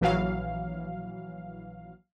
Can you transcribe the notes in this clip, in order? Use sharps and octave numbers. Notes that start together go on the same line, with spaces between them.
A#1 E3 F#3 F5